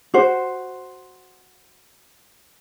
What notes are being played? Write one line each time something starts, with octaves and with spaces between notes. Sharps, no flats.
F#4 C5